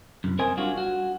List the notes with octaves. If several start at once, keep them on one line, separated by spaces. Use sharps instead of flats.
C2 F#2
C4 A#4 C5 D#5 G#5
G3 D4 F4 F#4
F#4